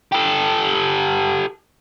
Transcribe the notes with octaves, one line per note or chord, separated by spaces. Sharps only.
G4 A4